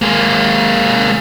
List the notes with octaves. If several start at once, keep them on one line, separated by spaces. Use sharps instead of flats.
G#3 A#3